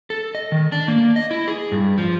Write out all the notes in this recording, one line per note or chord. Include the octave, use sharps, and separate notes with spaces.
A4
D#5
D#3
D4
A#3
D#5
E4
G#4
G2
F3